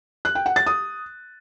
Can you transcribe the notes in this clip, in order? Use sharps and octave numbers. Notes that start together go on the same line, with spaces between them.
F#6
G5
F#5
A6
D#6